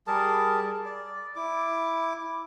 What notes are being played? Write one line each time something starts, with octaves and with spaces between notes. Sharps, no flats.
G3 G#4 A#4 A5
D5
E4 D6